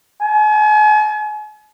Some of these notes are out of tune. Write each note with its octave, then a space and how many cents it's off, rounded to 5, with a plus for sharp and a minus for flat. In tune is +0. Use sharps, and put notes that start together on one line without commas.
G#5 +40